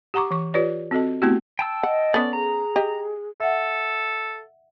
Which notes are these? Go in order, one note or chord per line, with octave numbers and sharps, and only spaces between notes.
G4 F#5 A#5 C#6 D6
E3 C#6
F4 G4 B4 C#5 D5
C4 F#4 A4 D#5 A5
A3 B3 C4 E4 F#4 G4
G5 A5 E6
D#5 F#5
B3 C#4 A4 D5
G#4 A#5
G4 D#5
A4 E5 F#5